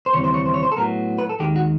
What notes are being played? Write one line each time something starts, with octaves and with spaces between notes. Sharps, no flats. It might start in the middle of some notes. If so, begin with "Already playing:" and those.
C5
D#2 C#3 E3 G3 C4 C#5
C5
C#5
C5
C#5
C5
A4
A2 F#3 B3 A#4
B4
A4
D#2 D#3 G#3 G4
F#4